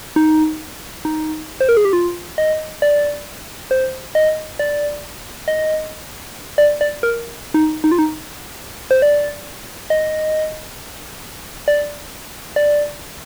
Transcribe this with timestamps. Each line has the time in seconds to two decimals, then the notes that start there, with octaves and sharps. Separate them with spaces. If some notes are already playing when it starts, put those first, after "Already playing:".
0.16 D#4
1.05 D#4
1.61 C5
1.69 A#4
1.77 G#4
1.85 G4
1.93 F4
2.38 D#5
2.82 D5
3.71 C5
4.15 D#5
4.59 D5
5.48 D#5
6.58 D5
6.81 D5
7.03 A#4
7.54 D#4
7.84 D#4
7.92 F4
7.99 D#4
8.91 C5
9.02 D5
9.90 D#5
11.68 D5
12.56 D5